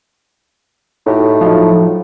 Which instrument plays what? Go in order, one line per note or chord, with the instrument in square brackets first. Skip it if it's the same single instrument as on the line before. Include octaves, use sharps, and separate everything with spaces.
[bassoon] A2 [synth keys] D#4 F#4 G4
[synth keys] F3 F#3 D#4